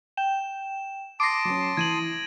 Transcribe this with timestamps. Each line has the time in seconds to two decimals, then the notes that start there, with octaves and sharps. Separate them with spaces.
0.17 G5 E7
1.20 A5 C6 D6 D#6 A#6 C7 D7
1.45 F#3 C#4
1.77 E3 G#6 D#7 F#7